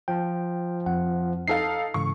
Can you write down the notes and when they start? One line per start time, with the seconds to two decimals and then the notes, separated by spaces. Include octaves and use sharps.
0.08 F3 G5
0.86 F2 F#5
1.48 D#4 A4 F5 C7
1.94 G#2 C#3 E3 C#6